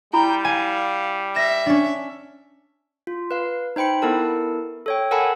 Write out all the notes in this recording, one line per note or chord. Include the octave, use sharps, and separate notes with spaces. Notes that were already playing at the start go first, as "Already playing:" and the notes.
G3 E4 G5 A#5 B5
F5 G#5
E5 A#6
C#4 D4
F4
B4 F5
D#4 C5 G5 B5 C#7
B3 E4 A4 A#4 A5
A4 C#5 G5
A4 A#4 F#5 G#5 A5 B5